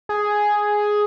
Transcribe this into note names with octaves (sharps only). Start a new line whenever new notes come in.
G#4